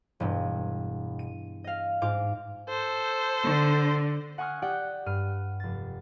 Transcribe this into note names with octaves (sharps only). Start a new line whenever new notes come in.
E1 G2
D#7
D#5 F5
G#2 F4 D6
A4 C5
D3
F#5 G#5 C#6 D#6 F6
G4 D5 F#5 G5
G2 F6 D#7
F1 A6